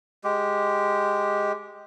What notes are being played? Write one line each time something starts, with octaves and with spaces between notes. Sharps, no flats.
G#3 G4